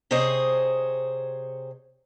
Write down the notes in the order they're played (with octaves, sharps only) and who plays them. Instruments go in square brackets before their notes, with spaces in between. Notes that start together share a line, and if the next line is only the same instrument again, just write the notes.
[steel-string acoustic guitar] C3 G#4 C5 C#5 D#5